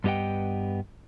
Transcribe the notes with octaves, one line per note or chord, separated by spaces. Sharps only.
G2 B3 G4 D#5 F#5 G5